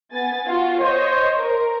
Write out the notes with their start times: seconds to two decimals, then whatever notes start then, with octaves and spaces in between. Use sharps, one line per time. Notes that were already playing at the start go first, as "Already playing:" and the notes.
0.11 B3 G#5 A6
0.47 F4 F#4
0.80 C5 C#5 D#5
1.38 A#4